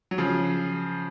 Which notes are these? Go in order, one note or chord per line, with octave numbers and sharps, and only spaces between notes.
F#3
C#3 F3